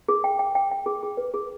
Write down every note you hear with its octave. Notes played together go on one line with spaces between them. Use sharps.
G#4
G5
G5
G5
G5
G#4
G#4
B4
G#4